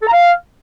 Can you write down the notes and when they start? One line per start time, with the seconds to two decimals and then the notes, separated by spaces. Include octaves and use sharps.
0.01 A4
0.06 A#5
0.12 F5